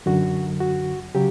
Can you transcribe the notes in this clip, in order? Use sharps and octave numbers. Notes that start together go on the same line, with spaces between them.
F#2 D3 F#3 F#4
F#4
C#3 F#3 G4